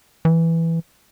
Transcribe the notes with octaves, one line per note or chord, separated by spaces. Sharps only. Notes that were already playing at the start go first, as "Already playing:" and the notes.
E3